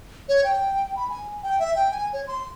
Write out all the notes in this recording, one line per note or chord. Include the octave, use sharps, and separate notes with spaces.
C#5
G5
B5
G#5
G5
E5
G5
G#5
C#5
C6